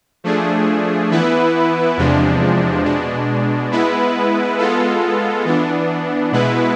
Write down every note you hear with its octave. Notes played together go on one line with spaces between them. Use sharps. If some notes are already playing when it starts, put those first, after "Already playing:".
F3 A3 D4 G#4
E3 B3 E4 B4
E2 C3 F3 G#3 D4
B2 G#3 D4
G#3 B3 E4 B4
G#3 B3 F4 A4
E3 B3 D4
B2 G#3 B3 E4 B4